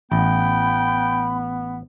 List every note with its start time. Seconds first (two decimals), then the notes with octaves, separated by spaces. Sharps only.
0.12 A1 B3 G5 B5